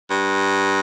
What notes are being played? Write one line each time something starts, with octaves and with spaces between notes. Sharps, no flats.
G2